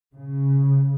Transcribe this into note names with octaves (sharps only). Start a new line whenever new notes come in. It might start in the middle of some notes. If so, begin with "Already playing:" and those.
C#3